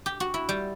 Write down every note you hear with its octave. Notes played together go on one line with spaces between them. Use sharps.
G4
F#4
E4
G3